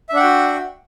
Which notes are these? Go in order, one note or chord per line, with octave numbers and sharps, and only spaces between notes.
D4 F#4 E5 F#5 G5